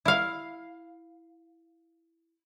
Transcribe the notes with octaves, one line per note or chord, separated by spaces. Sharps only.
E4 F5